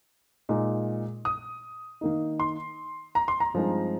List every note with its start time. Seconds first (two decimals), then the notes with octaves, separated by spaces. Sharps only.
0.49 A#2 G#3 D#4
1.25 D#6
2.01 D#3 A#3 D#4
2.40 C6
3.15 A#5
3.28 C6
3.40 A#5
3.54 G2 F3 G#3 C4 D#4